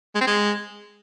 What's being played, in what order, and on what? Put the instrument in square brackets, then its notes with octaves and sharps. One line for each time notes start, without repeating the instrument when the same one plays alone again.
[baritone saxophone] G#3
C4
G#3